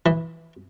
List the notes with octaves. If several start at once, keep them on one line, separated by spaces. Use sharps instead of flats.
E3